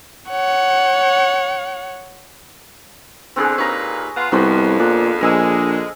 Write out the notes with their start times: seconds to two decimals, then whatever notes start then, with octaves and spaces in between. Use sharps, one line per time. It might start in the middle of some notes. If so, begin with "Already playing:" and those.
0.30 C#5 F#5
3.36 E2 D3 C4 D4 G#4
3.58 D#2 A#2 B4 C#5 A#5
4.17 B3 F4
4.32 C2 F2 B3 C5
4.79 A#2 D4
5.21 A#1 D3 G#3 A#4 G#5 E6